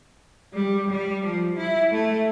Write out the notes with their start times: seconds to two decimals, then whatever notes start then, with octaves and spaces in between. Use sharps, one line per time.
0.54 G3
0.88 G3
1.26 F3
1.57 E4
1.92 A3